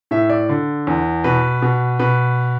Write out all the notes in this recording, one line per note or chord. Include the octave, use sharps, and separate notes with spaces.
A2 E5
D5
D3
E2
B2 B4
B2
B2 B4